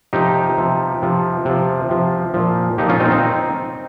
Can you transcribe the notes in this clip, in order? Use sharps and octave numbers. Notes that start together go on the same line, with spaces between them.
C3 F3 D#4 G4
C3 F3
C3 F3
C3 F3
C3 F3
A#2 F3
A#2 F3 D#4 G4
C#4 F4
C4 D#4
C4 D#4